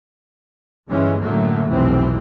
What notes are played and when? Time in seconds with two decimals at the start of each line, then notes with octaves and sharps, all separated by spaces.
0.87 G1 G2 E3 G#3 C#4
1.20 F#2 A2 D3 F#3 A3 A#3
1.70 F1 B1 A2 E3 C4